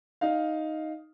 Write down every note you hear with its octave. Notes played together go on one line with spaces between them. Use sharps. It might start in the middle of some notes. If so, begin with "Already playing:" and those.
D#4 F5